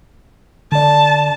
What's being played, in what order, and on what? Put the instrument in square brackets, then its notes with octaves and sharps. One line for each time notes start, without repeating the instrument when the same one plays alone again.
[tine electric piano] D3 D5 [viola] A5